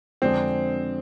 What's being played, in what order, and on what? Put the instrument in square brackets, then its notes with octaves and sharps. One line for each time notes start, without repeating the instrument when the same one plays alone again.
[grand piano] F2 D3 G#3 D4 G#4 [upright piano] C4